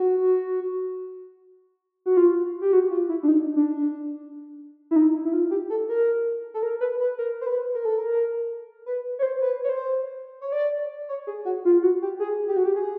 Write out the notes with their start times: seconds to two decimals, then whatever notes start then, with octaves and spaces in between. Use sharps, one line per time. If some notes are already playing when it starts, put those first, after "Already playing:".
Already playing: F#4
2.06 F#4
2.17 F4
2.61 G4
2.73 F#4
2.91 F4
3.09 E4
3.23 D4
3.28 D#4
3.56 D4
4.91 E4
4.96 D#4
5.25 E4
5.33 F4
5.51 G4
5.70 A4
5.89 A#4
6.54 A4
6.63 A#4
6.81 B4
7.00 B4
7.18 A#4
7.41 C5
7.47 B4
7.75 A#4
7.85 A4
7.98 A#4
8.86 B4
9.19 C#5
9.23 C5
9.42 B4
9.64 C#5
9.69 C5
10.41 C#5
10.52 D5
11.09 C#5
11.27 G#4
11.45 F#4
11.65 F4
11.82 F#4
12.02 G4
12.20 G#4
12.48 G4
12.56 F#4
12.66 G4
12.76 G#4